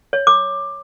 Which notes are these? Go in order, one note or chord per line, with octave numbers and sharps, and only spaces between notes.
C#5
D6